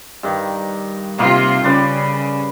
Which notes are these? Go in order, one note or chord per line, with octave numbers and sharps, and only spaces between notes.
G2 D#3
C3 A#3 D#4 F4
C#3 G3 B4 D5